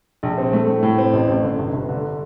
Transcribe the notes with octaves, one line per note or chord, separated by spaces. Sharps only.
A#1
C4
A3
A2
A2
C4
A1
A1
D3
G1
G1
D3